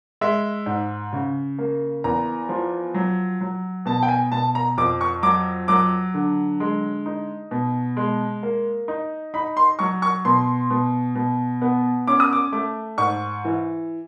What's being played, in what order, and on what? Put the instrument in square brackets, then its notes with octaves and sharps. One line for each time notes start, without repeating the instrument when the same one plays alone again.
[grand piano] G#3 E5
G#2
C#3
A#3
E2 A#5
F3
F#3
F#3
B2 A5
G5
G#5
B2 A5
A#5
F2 D6
C#6
F#3 D6
F#3 D6
D3
G#3
D#4
B2
G#3
A#3
D#4
D#4 B5
C6
F#3 C#6
C#6
B2 C6
B2
B2
B3
C#4 D6
D#6
D6
A3 D6
G#2 C#6
E3